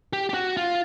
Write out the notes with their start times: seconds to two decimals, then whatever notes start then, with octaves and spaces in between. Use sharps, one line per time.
0.13 G4
0.29 G4
0.34 F#4
0.57 F4